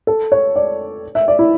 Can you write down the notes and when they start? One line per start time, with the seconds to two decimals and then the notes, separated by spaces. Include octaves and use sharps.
0.07 A4
0.32 C#5
0.56 D5
1.15 E5
1.28 D5
1.39 E4